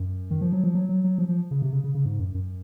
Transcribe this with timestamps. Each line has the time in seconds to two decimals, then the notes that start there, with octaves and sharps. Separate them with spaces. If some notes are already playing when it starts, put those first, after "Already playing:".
Already playing: F#2
0.31 D#3
0.41 F3
0.53 F#3
0.64 F3
0.75 F#3
0.89 F#3
1.04 F#3
1.18 F3
1.29 F3
1.51 C#3
1.62 C3
1.73 C#3
1.84 C#3
1.94 C#3
2.05 G#2
2.20 F#2
2.35 F#2